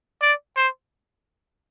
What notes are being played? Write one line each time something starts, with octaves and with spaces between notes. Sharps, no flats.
D5
C5